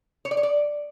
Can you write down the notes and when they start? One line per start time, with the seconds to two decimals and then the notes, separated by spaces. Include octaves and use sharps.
0.25 C#5
0.31 D5
0.37 C#5
0.43 D5